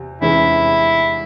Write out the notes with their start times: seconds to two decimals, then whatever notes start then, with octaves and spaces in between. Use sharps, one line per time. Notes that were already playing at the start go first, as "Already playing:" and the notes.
Already playing: E2 C3
0.21 E2 C3 E3 G#3 C#4 E4